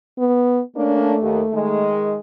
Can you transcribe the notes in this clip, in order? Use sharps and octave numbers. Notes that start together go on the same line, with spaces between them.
B3
A3 A#3 C#4 D4
D#2
D#3 G#3